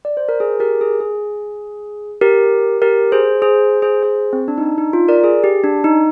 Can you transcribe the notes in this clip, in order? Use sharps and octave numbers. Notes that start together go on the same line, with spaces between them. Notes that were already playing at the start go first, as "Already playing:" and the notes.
D5
C5
A#4
G#4
G4 A#4
G#4
G#4
G4 A#4
G4 A#4
G#4 C5
G#4 C5
G#4 C5
G#4 C5
C4
D4
D#4
D4
D#4
F4
A#4 D5
G#4
G4
D4
D#4